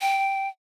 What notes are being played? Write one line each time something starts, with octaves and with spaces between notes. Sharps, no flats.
G5